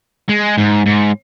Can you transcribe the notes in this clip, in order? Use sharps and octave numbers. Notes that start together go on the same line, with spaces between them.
G#3
G#2
G#2